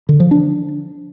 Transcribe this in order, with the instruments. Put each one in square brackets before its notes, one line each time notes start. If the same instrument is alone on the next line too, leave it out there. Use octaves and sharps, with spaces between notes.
[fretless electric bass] D3
F3
D4